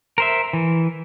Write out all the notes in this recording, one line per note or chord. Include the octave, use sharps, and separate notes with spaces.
A#4 C5 E5
E3